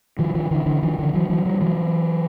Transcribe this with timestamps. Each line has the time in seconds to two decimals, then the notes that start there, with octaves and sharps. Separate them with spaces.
0.19 D#3 F3
0.35 D#3 F3
0.51 D3 E3
0.66 D3 E3
0.82 D#3 F3
0.99 D3 E3
1.13 E3 F#3
1.29 E3 F#3
1.45 F3 G3
1.61 E3 F#3